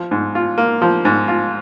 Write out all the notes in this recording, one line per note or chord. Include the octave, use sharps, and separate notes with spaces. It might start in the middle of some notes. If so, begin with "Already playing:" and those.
Already playing: F3
G#2
F4
A#3
F3
G#2
F4